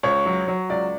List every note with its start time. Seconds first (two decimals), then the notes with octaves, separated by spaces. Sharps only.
0.03 C#2 C#5
0.26 F#3
0.48 F#3
0.69 C#2 D5